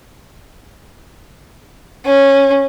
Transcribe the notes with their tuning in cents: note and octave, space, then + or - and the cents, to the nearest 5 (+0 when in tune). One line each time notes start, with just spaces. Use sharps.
C#4 -10